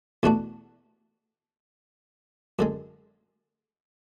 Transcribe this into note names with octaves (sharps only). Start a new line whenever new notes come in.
E2 B2 A3 D4 F#4
F#2 D3 G#3